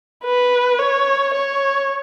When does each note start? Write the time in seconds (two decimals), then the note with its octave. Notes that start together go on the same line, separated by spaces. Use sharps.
0.24 B4
0.79 C#5
1.34 C#5